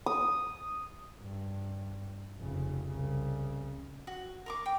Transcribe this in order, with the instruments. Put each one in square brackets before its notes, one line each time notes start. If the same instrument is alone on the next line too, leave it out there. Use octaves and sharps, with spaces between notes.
[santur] D#6
[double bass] G2
F1 C#3
C2 C#3
[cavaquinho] F#4
A#4 C#6 D6
G5